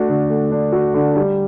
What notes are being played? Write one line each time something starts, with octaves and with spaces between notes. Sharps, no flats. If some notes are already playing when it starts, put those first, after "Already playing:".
Already playing: A3 D4 F#4
D3
A3
D4
F#4
D3
G3